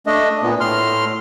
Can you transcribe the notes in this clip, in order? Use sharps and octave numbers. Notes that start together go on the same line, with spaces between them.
A3 D4 D#5
A#2 B3
A2 C6 F6